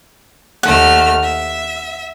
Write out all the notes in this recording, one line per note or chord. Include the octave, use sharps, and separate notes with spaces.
D#2 A3 F#5 F6
E5